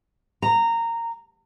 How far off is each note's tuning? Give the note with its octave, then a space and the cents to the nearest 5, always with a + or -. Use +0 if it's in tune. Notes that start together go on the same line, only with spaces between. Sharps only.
A#5 -15